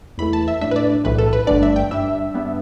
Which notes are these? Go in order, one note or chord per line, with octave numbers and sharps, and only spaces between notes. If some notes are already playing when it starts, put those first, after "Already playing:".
E2 E3 A3 B5
A5
E5
A2 A3 D4 E5
B4
D5
B1 A2 E3 B4
A4
B4
G1 G2 D3 A3 D4 D5
E5
G5
G2 G3 D4 E5
G2 G3 B3 D4